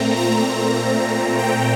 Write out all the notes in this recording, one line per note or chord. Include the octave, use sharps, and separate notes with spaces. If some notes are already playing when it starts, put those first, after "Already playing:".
Already playing: A#2 A3 C4 A#5
A#5
G5